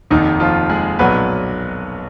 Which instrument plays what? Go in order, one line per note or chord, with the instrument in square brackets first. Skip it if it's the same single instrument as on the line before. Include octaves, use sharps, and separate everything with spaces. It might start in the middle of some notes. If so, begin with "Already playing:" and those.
[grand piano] F1 D#2 D#3 D#4
F3 F4
G#3 G#4
B1 A#2 F#3 B3 B4